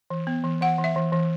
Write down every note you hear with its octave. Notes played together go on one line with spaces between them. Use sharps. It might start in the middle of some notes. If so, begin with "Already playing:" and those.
E3
B3
E3
E3 F#5
E3
E5
E3
E3